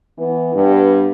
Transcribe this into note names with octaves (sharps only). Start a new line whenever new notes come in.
E3 B3
G2 B3